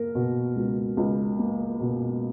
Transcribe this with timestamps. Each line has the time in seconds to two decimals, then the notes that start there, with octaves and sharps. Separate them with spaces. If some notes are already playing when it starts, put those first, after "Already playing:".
Already playing: A#3 A#4
0.15 B2
0.56 C#2
0.97 C#2
1.39 A#3
1.80 B2